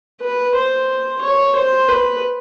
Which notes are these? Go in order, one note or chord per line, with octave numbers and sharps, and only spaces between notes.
B4
C5
C#5
C5
B4